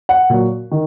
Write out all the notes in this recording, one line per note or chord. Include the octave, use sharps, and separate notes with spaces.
F#5
A#2 F#3
D#3